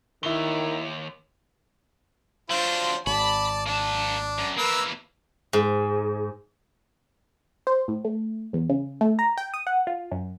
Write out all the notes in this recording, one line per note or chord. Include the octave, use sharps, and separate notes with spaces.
D#2 D#3 E4 G7
F#3 D4 F4 C5
G#1 D5 A5 B5
A#3 D4 A5
F#2
E3 A#3 A#4 B4 E6
G#2
C5
A2
A3
E2
C#3
A3
A#5
G5
D#6
F#5
F4
F#2